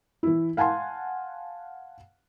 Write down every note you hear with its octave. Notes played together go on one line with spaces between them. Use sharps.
E3 E4
F5 F#5 G#5 A5 C6